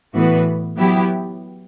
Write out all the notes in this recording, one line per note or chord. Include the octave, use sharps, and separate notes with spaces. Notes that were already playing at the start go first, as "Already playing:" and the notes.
A2 E3 B3 F#4 B4
F#3 B3 E4 G4